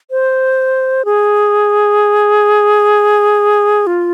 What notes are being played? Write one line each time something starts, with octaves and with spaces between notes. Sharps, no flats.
C5
G#4
F4